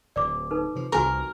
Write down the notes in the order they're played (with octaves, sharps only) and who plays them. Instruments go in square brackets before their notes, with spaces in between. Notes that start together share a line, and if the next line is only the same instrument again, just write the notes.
[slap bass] D1 [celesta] D5 D6
[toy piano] D#4 A4 B4
[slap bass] C3 F3
[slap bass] C2 F3 [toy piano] F#4 G#5 C#6 [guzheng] A#4